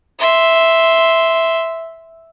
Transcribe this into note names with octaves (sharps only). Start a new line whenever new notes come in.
E5 C6